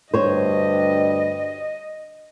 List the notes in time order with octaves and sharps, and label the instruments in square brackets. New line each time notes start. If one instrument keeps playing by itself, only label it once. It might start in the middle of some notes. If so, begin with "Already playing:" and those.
[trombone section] D2 G2 [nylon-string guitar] C5 C#5 [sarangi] D#5